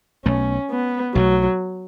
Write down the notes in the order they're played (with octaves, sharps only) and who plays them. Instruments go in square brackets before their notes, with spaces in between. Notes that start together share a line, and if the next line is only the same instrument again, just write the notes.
[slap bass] B1 B2 A3 [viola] C#4
[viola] B3
[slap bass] B1 B2 A3 [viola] F#3